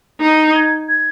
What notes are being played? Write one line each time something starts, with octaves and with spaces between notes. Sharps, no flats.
D#4
G6
G#6
G#6